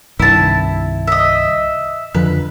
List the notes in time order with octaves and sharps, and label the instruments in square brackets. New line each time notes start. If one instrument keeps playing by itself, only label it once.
[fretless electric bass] C2 G2 D#3 [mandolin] E4 A5
[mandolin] D#5 E5
[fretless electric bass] F2 D3 F3 [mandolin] B4